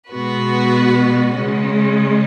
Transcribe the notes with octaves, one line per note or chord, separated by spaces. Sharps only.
B2 G#3 B3 F#4 B4
C#3 G#3 C#4